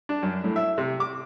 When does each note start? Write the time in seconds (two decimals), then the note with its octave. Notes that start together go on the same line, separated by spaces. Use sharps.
0.09 D4
0.23 F#2
0.44 A2
0.56 E5
0.78 C3
1.00 D6